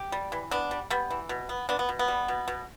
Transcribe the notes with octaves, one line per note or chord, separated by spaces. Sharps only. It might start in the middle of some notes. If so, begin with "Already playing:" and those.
Already playing: G4
G3
E3
B3 D4
G3
G3 B3
E3
B2
B3
B3 D4
B3
B2
B3
G3
B2
B2